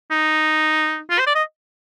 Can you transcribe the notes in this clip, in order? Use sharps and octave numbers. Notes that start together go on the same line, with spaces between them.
D#4
F4
C5
D5
D#5